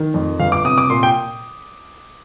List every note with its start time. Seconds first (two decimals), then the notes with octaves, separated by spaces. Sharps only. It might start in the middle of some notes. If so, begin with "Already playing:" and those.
Already playing: D#3
0.14 F2
0.40 G1 F5
0.52 D6
0.65 C3 D#6
0.78 D6
0.90 A#2 C6
1.03 G5